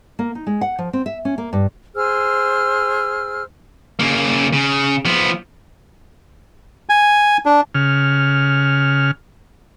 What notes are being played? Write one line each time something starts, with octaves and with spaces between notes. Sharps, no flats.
A#3
D#4
G#3
F#5
F3
C4
E5
C#4
A#3
G2
G#4 C5 E6 F6
C#3 A#3
C#3
F3 B3
G#5
D4
C#3 F6